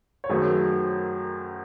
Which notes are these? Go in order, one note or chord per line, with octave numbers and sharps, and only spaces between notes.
C#5
F#2 D#3 F#3 A3 G#4 C5